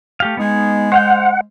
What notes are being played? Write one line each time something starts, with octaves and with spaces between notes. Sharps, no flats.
A3 G4 F5
G#3 B3 D#4 G#4
C5 F5 F#5 G6